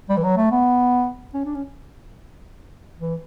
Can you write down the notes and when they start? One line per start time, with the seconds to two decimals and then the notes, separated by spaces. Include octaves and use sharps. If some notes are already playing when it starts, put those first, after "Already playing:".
0.09 G3
0.17 E3
0.23 F#3
0.37 A3
0.51 B3
1.34 C#4
1.45 D4
1.55 C#4
3.00 E3